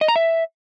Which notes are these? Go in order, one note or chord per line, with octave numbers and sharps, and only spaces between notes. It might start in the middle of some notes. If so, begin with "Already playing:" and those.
D#5
A#5
E5